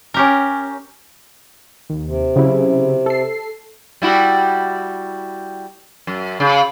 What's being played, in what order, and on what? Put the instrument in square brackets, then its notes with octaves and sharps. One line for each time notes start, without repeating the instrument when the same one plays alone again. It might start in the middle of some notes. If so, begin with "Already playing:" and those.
[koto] C#4 G4 A#4
[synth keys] D#2
[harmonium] C3
[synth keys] C#3 F#3 E4
A4 C7
[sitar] G3 E4 F#4
F#2
C#3